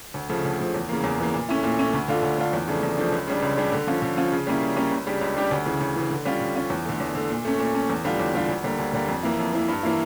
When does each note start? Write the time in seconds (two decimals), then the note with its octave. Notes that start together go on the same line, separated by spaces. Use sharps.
0.14 D2
0.29 C#3 F3 A3
0.45 D2
0.59 C#3 F3 A3
0.74 E2
0.89 C#3 E3 A#3
1.04 E2
1.19 C#3 E3 A#3
1.34 A#2
1.49 A3 C#4 E4
1.63 A#2
1.78 A3 C#4 E4
1.93 D2
2.08 D3 A3 D4 F4
2.23 D2
2.38 D3 A3 D4 F4
2.53 E2
2.68 C#3 F3 A3 D4
2.83 E2
2.98 C#3 F3 A3 D4
3.12 C#2
3.27 C#3 G3 D4
3.42 C#2
3.57 C#3 G3 D4
3.72 D3
3.87 F3 C#4 F4
4.02 D3
4.17 F3 C#4 F4
4.32 C#3
4.47 G3 A#3 C#4 E4
4.62 C#3
4.76 G3 A#3 C#4 E4
4.91 C#2
5.06 C#3 G3 D4 G4
5.21 C#2
5.36 C#3 G3 D4 G4
5.51 D2
5.66 C#3 E3
5.81 D2
5.96 C#3 E3
6.10 D3
6.25 G3 C#4 F4
6.40 D3
6.55 G3 C#4 F4
6.70 E2
6.85 D3 A3
7.00 E2
7.15 D3 A3
7.30 A#2
7.45 A3 C#4
7.59 A#2
7.74 A3 C#4
7.90 E2
8.05 D3 G3 D4 F4
8.20 E2
8.34 D3 G3 D4 F4
8.49 D2
8.64 D3 G3 A#3
8.79 D2
8.94 D3 G3 A#3
9.08 F2
9.23 E3 A#3 E4
9.39 F2
9.53 E3 A#3 E4
9.68 G2
9.83 E3 A#3 E4